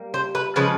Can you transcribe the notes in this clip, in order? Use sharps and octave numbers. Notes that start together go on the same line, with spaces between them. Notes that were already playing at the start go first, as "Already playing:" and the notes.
Already playing: G3 A#3
C5
B4
C#3 F3 G#3 B4